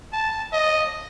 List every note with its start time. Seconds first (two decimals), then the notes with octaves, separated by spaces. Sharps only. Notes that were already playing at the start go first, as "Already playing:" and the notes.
0.13 A5
0.53 D#5